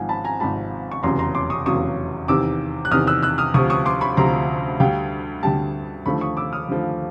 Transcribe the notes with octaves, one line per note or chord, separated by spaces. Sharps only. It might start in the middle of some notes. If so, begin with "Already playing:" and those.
Already playing: G#1 G#2 F3 F#5 G#5
A5 B5
G#5 A#5
G#1 G#2 F3 A5 B5
C#6
F1 E2 C#3 F#3 A#5 C6
A#5 C6
C6 D6
C#6 D#6
F1 E2 C#3 F#3 C#6 D#6
E2 C3 D#3 D6 E6
F#6
E2 C3 D#3 D#6 F6
E6 F#6
E6 F#6
D#6 F6
D2 C3 F3 C#6 D#6
C#6 D#6
C6 D6
B5 C#6
D2 C3 F3 A#5 C6
D2 D3 G3 F5 G5
D2 D3 G3 G5 A5
D#2 D3 F3 A3 B5 C#6
C#6 D#6
D6 E6
D#6 F6
D#2 D3 F3 A3